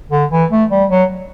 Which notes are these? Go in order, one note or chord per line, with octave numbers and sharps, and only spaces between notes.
D3
E3
A3
G3
F#3